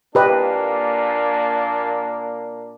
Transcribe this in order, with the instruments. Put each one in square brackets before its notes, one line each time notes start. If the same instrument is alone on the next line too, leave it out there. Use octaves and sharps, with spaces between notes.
[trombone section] A#2 A#3 D4 [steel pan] G4 B4 D#5